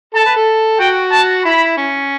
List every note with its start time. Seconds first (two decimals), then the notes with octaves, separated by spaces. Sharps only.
0.14 A4 A5
0.26 B4
0.36 A4
0.79 F#4 G5
1.12 A5
1.45 E4 B5
1.77 C#4